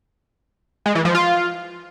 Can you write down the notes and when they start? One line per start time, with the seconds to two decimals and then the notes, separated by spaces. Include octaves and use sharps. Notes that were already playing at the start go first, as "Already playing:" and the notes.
0.86 G#3
0.95 E3
1.05 F3
1.15 F4